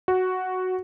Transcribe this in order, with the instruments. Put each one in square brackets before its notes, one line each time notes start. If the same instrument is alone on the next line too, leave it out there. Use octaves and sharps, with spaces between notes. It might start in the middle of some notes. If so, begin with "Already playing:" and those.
[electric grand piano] F#4